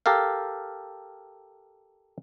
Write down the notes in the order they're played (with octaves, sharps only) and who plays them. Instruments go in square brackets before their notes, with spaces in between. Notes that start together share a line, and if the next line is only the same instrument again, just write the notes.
[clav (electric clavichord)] G4 A4 A#4 F5